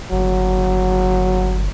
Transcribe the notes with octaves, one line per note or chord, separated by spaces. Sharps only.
G1 F#3